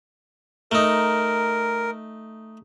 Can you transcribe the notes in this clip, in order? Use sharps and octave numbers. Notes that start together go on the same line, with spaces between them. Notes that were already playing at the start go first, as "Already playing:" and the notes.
A3 D#4 A#4